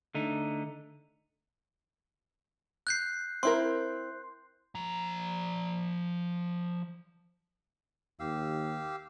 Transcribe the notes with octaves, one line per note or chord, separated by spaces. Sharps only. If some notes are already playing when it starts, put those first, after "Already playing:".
D3 A3 D#4
F#6 G6 C7
C4 E4 A#4 C6
F3 A#5
D#2 G4 F5 E6